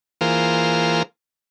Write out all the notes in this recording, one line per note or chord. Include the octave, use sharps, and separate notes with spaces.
E3 A#3 F4 G#4 A#4 C5